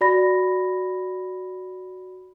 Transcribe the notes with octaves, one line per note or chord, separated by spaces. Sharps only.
F#4 D5 B5 A#6